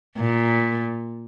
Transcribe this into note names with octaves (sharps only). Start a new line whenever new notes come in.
A#2